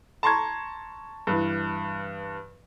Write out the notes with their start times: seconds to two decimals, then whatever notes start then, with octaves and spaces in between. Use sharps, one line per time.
0.23 A5 A#5 C6 C#6 G#6
1.27 G2 E3